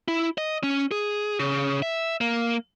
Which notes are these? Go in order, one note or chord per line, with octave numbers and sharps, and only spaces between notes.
E4
D#5
C#4
G#4
C#3
E5
A#3